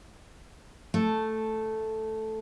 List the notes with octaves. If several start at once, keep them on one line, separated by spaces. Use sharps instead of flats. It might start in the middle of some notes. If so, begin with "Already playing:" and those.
A3